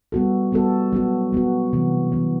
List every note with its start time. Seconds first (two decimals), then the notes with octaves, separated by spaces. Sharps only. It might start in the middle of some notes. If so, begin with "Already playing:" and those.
0.12 G3 B3 F#4 A4
0.52 G3 B3 F#4 A4
0.93 F#3 B3 F#4
1.33 F#3 B3 F#4
1.73 C3 E3 B3
2.12 C3 E3 B3